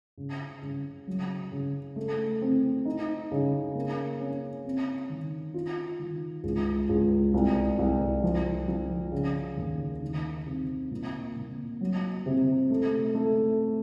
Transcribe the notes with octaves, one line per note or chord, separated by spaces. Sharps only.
C#3
C#3
F#3
C#3
A3
C4
D#4
C#3
A#3
C#4
C4
D#3
F4
D#3
C#2
C#2
C2
C2
F3
F3
C#3
D#2
D#3
C3
A#2
A#2
F#3
C3
A3
A3